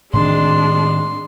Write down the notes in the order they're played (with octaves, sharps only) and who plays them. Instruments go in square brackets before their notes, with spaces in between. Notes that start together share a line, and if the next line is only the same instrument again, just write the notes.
[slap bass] A2 D#3 C4 [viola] G#3 D4 [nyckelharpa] C6